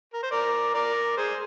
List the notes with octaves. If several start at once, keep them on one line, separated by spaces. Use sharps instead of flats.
A#4
C5
A#4 D5
A#4 D5
G#4 C5